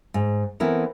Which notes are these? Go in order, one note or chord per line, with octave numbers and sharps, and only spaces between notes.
G#2
E3 B3 C4 E4 A4 A#4